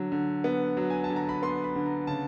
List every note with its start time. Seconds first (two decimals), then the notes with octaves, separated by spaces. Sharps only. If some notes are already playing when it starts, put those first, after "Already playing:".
Already playing: D3 F#3
0.12 D3
0.44 B3
0.77 F#3
0.90 G#5
1.04 A5
1.10 D3
1.16 A#5
1.29 B5
1.42 B3 C6
1.64 B5
1.76 D3
1.86 A#5
2.07 C#3 A5